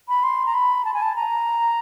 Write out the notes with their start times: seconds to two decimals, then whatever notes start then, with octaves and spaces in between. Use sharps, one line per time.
0.08 B5
0.23 C6
0.46 A#5
0.54 B5
0.85 A5
0.94 G#5
1.02 A5
1.16 A#5